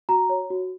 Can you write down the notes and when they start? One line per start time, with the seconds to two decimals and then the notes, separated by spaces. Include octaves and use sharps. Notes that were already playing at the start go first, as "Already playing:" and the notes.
0.09 F#4 A#5
0.29 C#5
0.50 F#4